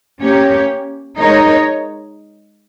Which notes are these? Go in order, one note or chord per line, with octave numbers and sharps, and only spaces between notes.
A#3 C#4 G4 C#5
G#3 D#4 A#4 C#5